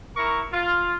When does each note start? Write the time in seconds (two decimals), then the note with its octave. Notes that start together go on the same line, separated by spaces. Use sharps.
0.17 E4 A#4 A#5 C#6
0.53 F4